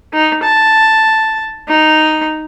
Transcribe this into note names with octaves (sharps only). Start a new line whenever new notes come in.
D#4
A5
D#4